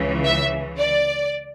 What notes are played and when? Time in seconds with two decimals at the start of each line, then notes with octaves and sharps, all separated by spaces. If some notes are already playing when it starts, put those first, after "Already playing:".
Already playing: C#2 C#3 E3
0.24 E5
0.78 D5